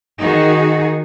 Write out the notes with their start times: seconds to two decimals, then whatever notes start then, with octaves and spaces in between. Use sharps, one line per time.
0.19 D#3 D#4 F#4 G#4